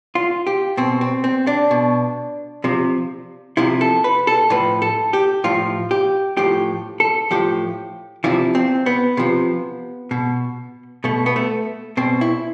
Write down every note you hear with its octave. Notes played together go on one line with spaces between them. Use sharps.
F4
G4
B2 C4
C4
C4
D4
B2
C3 F3
C3 F3 E4
A4
B4
A4
A2 F3 B4
A4
G4
A2 F3 F4
G4
A2 F3 G4
A4
A2 F3 G4
C3 F3 E4
C4
B3
C3 F3
B2
B2 A3
B3
A3
B2 C4
E4